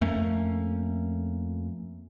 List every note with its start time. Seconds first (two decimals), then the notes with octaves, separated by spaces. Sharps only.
0.01 F2 A3 A#3 C#4